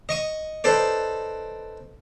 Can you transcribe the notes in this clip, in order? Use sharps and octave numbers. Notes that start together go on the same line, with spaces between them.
D#5 C#6 D#6
D#4 A4 B4 C5 D5